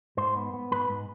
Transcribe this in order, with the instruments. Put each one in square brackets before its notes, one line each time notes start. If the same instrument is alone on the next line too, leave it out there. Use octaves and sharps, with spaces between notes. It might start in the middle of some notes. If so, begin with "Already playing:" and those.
[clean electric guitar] G#2 C5
B3
B3
G#2 B4
G#2